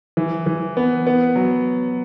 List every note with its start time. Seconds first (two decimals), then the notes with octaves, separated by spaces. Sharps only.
0.17 E3
0.46 E3
0.77 B3
1.07 B3
1.36 F#3